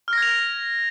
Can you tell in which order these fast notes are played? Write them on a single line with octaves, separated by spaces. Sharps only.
F6 A#6 G#6 F7